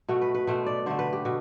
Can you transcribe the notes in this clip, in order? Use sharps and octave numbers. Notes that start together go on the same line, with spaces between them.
B2 A3 F#4
B4
B4
B2 A3 C5
D5
D3 A3 C5
B4
G4
B2 F#4